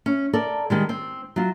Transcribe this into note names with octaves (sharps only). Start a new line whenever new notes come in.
C#4
A4 A#4 D5
D#3 G3 G#3
C4
F#3 F4